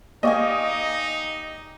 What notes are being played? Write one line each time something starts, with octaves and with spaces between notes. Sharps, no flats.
A#3 D#4 G4 D5 D#5 F5 G#5 C#6